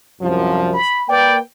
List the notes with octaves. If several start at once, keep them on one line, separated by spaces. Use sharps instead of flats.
C2 F#2 F3
B5
A#3 B4 D5 G5